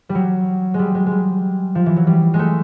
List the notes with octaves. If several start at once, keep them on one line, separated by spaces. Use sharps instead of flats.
G3
F#3
G3 G#3
G#3
G3 G#3
F3
E3
F#3
G3
G#3
A3